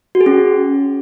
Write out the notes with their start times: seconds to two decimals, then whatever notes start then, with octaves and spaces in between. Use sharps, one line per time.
0.15 F#4
0.21 G#4
0.26 C#4